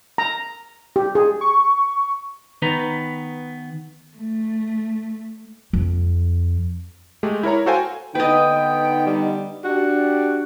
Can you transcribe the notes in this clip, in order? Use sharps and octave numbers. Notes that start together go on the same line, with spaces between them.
A#5
G4
G#4
C#6
D#3 B3 D#4 B4 A#5
A3
F2
G#3 A3 G4
E4 A#4 C#5 A#5
F#4 A4 C5 F5 G5 G#5
D3 B3 D#4 B4 D#5 G5
G3
D4 F#4 G4